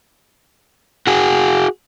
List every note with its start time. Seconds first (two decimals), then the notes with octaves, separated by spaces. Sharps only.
1.07 F#4 G#4